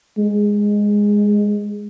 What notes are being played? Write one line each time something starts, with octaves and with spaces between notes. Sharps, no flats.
G#3